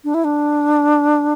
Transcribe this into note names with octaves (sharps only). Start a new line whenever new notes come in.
D4
E4
D4